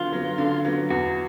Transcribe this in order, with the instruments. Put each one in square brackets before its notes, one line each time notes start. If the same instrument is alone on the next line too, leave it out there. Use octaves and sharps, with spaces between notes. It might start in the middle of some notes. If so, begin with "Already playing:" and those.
Already playing: [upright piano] D3 F#3 B3 [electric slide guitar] F4
[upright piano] F#3 B3
D3
F#3 B3
[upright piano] E2 [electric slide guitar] F#4